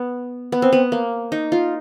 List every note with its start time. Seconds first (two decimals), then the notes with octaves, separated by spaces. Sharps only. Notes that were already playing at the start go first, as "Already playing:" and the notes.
Already playing: B3
0.52 B3
0.62 C4
0.73 B3
0.92 A#3
1.32 D#4
1.52 F4